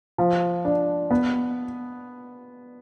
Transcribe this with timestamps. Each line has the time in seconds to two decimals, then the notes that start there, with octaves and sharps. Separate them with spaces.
0.18 F3
0.65 D4
1.11 B3